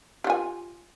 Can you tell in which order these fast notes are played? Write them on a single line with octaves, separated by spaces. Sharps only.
G4 F4 G#5